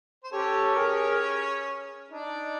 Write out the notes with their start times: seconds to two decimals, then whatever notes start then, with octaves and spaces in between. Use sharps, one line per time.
0.24 C5
0.32 C#4 G4 A4 C#5
0.76 G#4 A#4
2.09 D4 D#4 D5